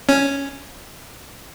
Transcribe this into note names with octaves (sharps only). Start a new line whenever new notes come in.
C#4